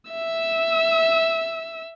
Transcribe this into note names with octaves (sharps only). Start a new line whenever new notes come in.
E5 E6